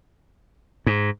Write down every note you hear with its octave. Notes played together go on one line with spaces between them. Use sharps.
G#2